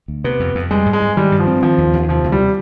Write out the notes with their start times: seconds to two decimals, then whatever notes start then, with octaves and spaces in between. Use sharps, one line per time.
0.08 D2
0.24 C3 B3
0.40 F2
0.55 F2
0.71 G3 G#3
0.86 G#2
0.93 G#3
1.02 G#2
1.17 D#3 G3
1.32 G2
1.39 F3
1.47 C4
1.63 D#3 F3
1.78 D#2
1.93 D#2
2.09 C3 F3
2.24 D2
2.32 G3